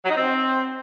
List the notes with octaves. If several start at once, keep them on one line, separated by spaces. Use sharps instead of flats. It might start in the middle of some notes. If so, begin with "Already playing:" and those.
F#3
D#4
C4